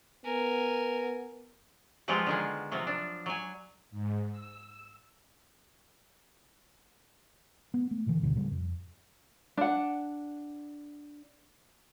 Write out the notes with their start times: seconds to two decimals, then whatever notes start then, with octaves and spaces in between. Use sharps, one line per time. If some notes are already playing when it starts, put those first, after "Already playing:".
0.25 B3 A#4 G#5
2.08 F3 F#3 G#3 B3 F4 G4
2.26 D3 D#3 G#3
2.71 C3 F3 F#3
2.87 D4
3.26 F#3 G#5
3.91 G#2
4.31 E6
7.74 B3
7.91 A3
8.06 A#2 D3 E3
8.21 D2 G2 B2 D3
8.35 A#2 C#3 G3
8.51 F2
9.57 D4 F#5